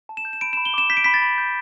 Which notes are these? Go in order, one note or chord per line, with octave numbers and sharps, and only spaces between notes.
A5
E7
G6
E7
B5 D7
E7
B5
G7
D6 E7
G6 B6
D7
B5 B6
A6
B5
G6